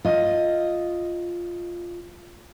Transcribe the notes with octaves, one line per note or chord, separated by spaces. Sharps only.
F4 D#5